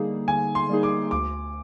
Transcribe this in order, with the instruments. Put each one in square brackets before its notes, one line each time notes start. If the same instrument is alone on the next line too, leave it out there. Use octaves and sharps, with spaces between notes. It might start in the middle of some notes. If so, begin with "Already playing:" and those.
Already playing: [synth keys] D3 G3 A#3 D#4 G#4
[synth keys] D3 [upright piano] G#5
[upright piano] C6
[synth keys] G3 A#3 D#4 G#4
[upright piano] D6
[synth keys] D2 [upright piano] D6